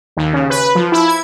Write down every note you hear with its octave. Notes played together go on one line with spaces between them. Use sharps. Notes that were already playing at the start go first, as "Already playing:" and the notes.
D#2
C#3
B4
F3
E4
G#6